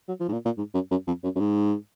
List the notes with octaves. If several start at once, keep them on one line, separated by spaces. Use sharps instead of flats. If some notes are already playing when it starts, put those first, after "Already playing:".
F#3
F3
G#2
A#2
A#2
G#2
F#2
F#2
F2
F#2
F#2
G#2